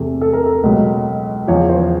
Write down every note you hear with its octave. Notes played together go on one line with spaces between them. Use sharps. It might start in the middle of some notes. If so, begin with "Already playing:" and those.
Already playing: E2 C3 E3 A3
A4
A#4
A4
C#2 B2 F#3
E2 C#3 F3 C#5
C5